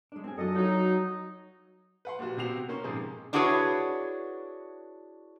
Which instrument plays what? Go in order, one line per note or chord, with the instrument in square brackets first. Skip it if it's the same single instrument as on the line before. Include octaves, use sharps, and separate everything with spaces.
[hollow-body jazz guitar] G#3 D4
C4 G#4
[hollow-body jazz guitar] F#2 F#3 F4 [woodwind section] D4 A4 D#5
[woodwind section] F#3 D#4 [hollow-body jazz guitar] F#4 F5
[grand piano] B4 F#5 C6
A#2 G3 F#4
C3 B3 C4 F#4 C7 F7
A#3 C#4 C6 C#6
G#2 C3 F3 G#4
[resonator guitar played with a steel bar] D4 E4 F#4 G#4 B4 C#5